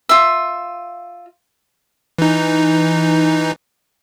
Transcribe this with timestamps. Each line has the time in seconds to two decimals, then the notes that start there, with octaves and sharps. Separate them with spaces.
0.09 F4 E5
2.18 E3 D#4